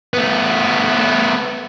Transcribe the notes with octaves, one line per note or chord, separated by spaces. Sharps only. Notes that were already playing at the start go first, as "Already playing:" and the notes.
A3 B3